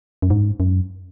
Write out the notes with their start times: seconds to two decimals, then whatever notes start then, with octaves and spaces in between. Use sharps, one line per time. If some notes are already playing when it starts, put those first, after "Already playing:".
0.22 F#2
0.30 G#2
0.60 F#2